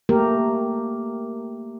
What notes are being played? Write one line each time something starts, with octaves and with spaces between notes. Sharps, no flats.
A3 A#3 G4 A#4